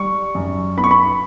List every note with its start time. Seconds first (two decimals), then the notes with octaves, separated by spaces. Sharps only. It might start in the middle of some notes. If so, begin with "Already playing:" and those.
Already playing: G3 C#6
0.35 F#2
0.77 B3 B5
0.84 C#6
0.91 B5